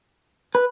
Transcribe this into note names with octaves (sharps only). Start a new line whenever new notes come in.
B4